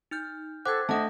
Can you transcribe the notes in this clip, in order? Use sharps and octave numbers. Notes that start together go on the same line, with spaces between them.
D#4 F6 G6
A4 C5 F#5 G5 D6 F#6 G#6
A3 D4 D#5 F#5 A5